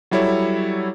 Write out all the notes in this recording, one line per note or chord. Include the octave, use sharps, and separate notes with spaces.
F#3 G3 E4 A4 C#5